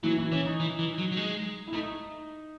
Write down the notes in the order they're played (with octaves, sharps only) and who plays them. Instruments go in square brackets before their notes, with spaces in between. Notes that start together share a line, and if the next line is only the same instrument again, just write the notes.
[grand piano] E3 E4 [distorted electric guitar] F#3
[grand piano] E3 E4
[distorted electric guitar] E3 [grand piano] C#4
[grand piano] D#4
[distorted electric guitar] E3
E3
F#3
F#3
G#3
[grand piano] E4
[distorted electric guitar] A3 [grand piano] D#4